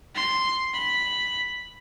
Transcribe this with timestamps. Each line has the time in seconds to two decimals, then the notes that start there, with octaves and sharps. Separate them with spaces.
0.15 C6
0.74 B5